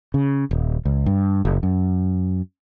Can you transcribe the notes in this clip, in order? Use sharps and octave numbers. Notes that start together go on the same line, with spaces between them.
C#3
D#1
C#2
G2
F#1
F#2